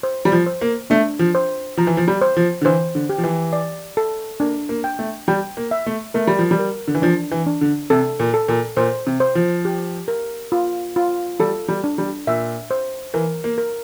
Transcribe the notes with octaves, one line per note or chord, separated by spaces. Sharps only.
C5
G3
F3
C5
A#3
A3 D4
F3
C5
F3 A#5
E3
F3
G3
C5
F3
D3
E3 C5
D3
G4
F3
E3
D5
A4
A#3 D4
A#3
G5
A3
G3 G5
A#3
E5
A3
A3 A#4
G3
F3
G3
A#4
D3
E3
F3 D4
E3
D4
D3
C3 A4
A#2
A4
A#2
A#2 C5
C3
C5
F3
G4
A#4
F4
F4
G3 A4
G3
D4
G3
A#2 E5
C5
E3 A#4
A#3
A#4